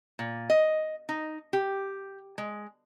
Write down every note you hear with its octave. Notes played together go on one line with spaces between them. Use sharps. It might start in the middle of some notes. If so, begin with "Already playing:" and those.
A#2
D#5
D#4
G4
G#3